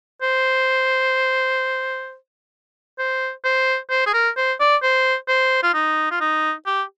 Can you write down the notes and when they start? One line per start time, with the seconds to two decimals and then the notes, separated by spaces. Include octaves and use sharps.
0.22 C5
2.99 C5
3.45 C5
3.90 C5
4.06 G#4
4.13 A#4
4.37 C5
4.60 D5
4.83 C5
5.28 C5
5.63 F4
5.74 D#4
6.11 F4
6.20 D#4
6.66 G4